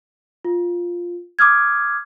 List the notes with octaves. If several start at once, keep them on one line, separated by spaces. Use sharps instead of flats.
F4
D6 D#6 F6 G#6